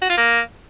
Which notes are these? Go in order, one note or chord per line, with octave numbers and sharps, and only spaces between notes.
F#4
F4
A#3